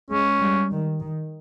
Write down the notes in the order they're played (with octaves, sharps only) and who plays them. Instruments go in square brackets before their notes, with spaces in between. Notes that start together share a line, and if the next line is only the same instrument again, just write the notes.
[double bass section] G#3 [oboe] C#4
[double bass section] G3
D#3
D#3